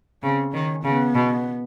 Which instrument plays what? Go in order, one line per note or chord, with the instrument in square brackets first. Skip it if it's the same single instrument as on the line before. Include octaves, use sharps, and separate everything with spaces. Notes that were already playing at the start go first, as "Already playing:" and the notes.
[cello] C#3 [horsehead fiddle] C4
[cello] D#3 [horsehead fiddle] C#4
[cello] C#3 [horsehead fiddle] B3
[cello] B2